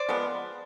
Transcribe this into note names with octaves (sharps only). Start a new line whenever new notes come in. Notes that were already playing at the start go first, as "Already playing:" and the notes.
Already playing: C5 D5
F3 G#3 B3